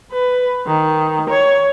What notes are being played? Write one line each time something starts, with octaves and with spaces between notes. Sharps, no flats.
B4
D#3
C#5